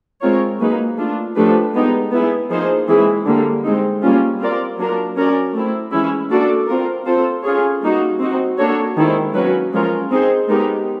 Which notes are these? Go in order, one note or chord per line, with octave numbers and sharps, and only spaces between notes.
G#3 C4 F4 A#4 C#5
F#3 A#3 D#4 G#4 B4
A3 D4 F4
F3 A3 D4 G4 B4
G#3 B3 D#4 G4
B3 E4 G#4
F3 A#3 D#4 G#4 C5
E3 G#3 C4 E4 G#4
D3 G3 A#3
G#3 C4 D#4
G3 A#3 C#4 F4
C4 F4 A#4 D5
F#3 A#3 D4 F4 A#4
C#4 F#4 A#4 D5
A3 C4 E4
E3 G#3 C#4 E4
A#3 D4 F#4 A4 D5
C4 F4 A#4
C4 F4 A4 C5
C#4 F4 G#4 C#5
G3 A#3 D#4 F#4
C4 D#4 F#4
A#3 D4 F#4 A4 C#5
D#3 G#3 C4 E4
F#3 A#3 C#4 F#4 B4
F3 G#3 C#4 F4 A#4
C4 D#4 G#4 C5
G#3 B3 D#4 G4 A#4